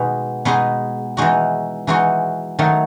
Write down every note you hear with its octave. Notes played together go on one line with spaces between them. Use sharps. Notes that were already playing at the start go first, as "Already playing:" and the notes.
Already playing: B2 G#3 B3 D#4 G#4
B2 G#3 B3 D#4 G#4
E3 G#3 D#4 F#4
E3 G#3 D#4 F#4
D#3 F#3 A3 D#4